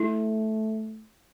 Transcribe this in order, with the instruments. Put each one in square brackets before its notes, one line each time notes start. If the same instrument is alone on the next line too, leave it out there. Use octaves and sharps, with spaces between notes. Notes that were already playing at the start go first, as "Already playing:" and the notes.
Already playing: [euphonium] A3 [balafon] E4